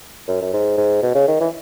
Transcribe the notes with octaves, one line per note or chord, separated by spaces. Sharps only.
F#2
F#2
G#2
G#2
B2
C#3
D#3
E3